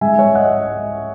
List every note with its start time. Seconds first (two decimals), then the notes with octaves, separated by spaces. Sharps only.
0.01 G#2 E5 G#5
0.18 C#5 E5
0.27 G#2
0.35 D#5 F#5